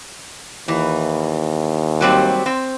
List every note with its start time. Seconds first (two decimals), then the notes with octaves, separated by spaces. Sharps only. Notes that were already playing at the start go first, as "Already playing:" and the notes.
0.68 D#2 E3
2.01 F#3 G3 C4
2.46 C4